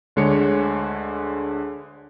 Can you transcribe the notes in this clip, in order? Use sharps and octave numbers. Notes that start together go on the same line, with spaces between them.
D2 D3 G#3 C#5 C#7